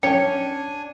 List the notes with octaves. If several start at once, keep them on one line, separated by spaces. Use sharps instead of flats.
C#4 D4 C#5 G5 G#5 C#7